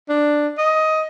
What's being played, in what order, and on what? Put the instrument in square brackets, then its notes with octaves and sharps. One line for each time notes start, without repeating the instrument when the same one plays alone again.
[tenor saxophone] D4
D#5